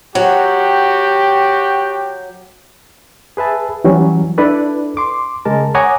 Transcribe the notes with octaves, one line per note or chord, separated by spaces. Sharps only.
F#3 F#4 G4 G5
G#4 B4 E5 A5
E3 F#3 G3 C#4
D4 E4 A4 B4 D5
C6 D6
C#3 G#3 A#4 A5
C#5 F#5 G#5 A#5 D6 D#6